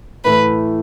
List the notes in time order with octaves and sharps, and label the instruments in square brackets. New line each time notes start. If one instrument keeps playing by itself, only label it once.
[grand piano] A2 E3 A3 [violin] B4